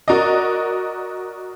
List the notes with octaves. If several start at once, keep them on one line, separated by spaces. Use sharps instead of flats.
F#4 A#4 D5 D#5